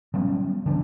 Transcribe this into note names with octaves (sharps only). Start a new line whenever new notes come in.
F#3 G3 B3 C#4
D3 E3 F#3 D4